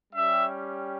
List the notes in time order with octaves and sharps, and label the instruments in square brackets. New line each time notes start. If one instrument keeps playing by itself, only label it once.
[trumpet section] G3 C#4 G4 E5